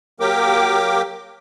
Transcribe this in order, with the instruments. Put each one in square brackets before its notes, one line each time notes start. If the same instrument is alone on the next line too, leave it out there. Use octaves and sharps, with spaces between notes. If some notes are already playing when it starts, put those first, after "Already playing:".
[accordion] F#3 A#3 G4 A#4 G5 D6